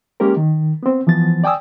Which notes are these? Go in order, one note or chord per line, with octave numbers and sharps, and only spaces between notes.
G#3 A#3 C#4 G4 A#4
D#3
B3 C4
E3 F3 B3 A6
D5 G5 G#5 D#6 E6